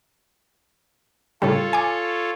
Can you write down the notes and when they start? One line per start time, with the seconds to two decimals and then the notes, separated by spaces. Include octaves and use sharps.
1.42 A2 C#3 G3 F4 A4 C#5
1.73 G#5 D6